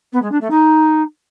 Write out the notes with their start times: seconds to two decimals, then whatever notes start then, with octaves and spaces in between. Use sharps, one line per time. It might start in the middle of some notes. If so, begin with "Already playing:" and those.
0.12 B3
0.22 G#3
0.31 D4
0.41 A3
0.50 D#4